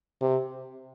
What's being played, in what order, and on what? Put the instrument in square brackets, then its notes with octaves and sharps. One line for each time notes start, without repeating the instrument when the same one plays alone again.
[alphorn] C3